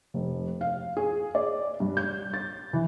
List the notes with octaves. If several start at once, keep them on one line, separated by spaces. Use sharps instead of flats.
F1
F5
G#4
D5
G2
G6
A6
E3